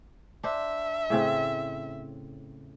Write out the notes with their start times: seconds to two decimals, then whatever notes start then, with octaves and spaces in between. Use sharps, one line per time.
0.44 D4 C5 E5
1.10 A2 C#3 C4